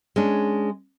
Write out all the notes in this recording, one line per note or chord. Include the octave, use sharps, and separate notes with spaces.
G#3 C#4 D4